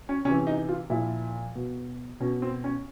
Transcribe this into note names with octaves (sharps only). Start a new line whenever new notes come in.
C#4
C3 E3 C#4
D#4
F4
A#2 F3 E4
B2
B2 C#4
C4
C#4